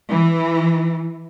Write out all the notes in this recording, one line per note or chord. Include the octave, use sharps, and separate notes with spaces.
E3